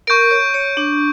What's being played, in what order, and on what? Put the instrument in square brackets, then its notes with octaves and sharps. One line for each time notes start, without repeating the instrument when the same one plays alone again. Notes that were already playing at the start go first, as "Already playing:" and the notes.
[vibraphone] A#4 [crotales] C#6 G6 D7
[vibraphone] C#5
C#5
D4